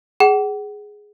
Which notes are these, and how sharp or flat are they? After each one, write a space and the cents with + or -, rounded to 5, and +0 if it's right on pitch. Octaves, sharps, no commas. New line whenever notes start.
G#4 +0 F#5 +35